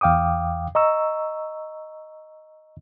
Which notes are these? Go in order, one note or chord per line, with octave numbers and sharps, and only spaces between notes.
E2 F5 G5 D6 D#6
D#5 A#5 C#6 E6